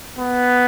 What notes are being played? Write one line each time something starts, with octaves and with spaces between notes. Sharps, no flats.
B3